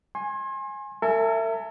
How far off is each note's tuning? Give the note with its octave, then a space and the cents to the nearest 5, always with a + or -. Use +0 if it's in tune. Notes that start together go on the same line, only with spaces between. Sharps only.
G#5 +0 C6 +35
A#4 -45 E5 +10 G#5 +30